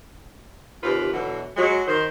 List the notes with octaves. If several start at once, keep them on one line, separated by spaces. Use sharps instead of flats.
D#2 C3 F4 B4
B2 D3 E3 F#3
F#3 G#3
D#3 C5